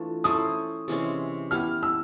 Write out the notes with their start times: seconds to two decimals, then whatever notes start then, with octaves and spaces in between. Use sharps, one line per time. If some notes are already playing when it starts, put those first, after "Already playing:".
Already playing: E3 A3 D4 F4
0.24 C#4 E4 A4 C5 D#6
0.88 C3 E3 G#3 C#4
1.51 B3 E4 G4 F6
1.83 E6